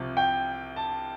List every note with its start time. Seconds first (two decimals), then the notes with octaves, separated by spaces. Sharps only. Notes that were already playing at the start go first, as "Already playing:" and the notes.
Already playing: C2 C3 F3
0.17 G5
0.76 A5